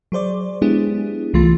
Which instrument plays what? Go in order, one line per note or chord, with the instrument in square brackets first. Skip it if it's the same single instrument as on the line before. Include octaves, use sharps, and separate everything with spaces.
[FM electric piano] F#3 G#4 C5 D5
G#3 B3 D4 E4 G4 G#4
C2 E3 A3 F4 C6 A6